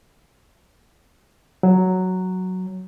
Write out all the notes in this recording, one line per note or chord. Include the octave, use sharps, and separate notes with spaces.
F#3